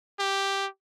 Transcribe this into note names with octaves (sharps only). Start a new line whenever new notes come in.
G4